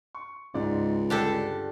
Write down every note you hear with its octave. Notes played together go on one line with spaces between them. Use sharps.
C#6
C#2 G#2 D#4 D5
G2 D3 D4 G4 A4